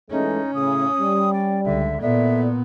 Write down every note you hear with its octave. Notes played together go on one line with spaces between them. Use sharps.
E3 G#3 A3 C#4 D#4
A2 C#3 D#6
G3
D5
C#2 D3 E5
A#2 B3 E4 A4 D5 E5